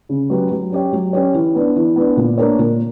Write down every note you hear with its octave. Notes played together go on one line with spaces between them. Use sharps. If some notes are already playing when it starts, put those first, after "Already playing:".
C#3
F#3 C#4 G4 B4
F#3
C#4 G4 C#5
F#3
C#4 G4 C#5
E3
B3 D4
E3
B3 D4
A#2
A#3 D4 A#4 C#5
A#2